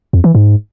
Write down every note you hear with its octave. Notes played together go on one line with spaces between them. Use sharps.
F2
E3
G#2